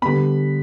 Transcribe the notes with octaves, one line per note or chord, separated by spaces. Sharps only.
D3 G3 B3 B5